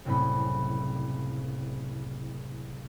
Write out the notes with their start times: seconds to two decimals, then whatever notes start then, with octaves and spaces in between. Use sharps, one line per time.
0.05 F#1 C2 A2 C3 C#4 B5